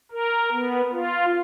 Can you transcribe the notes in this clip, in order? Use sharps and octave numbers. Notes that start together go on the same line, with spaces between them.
A#4
B3
F4